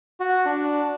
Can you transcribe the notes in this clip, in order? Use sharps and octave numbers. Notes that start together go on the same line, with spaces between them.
F#4
D4